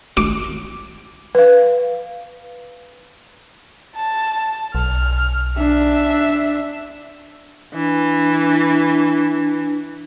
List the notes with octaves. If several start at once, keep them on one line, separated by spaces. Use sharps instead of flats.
D6
B4 F5
A5
B1 F6
D4 E5
E3 D4